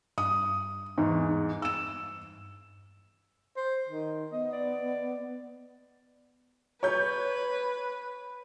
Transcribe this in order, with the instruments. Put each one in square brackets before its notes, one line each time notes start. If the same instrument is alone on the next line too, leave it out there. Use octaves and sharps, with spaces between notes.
[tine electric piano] G2 [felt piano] D#6
[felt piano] E2 G#2
E6 E7
[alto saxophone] C5
D#3
[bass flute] B3 [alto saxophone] D#5
[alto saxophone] D5
[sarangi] B4 [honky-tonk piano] C#5 G6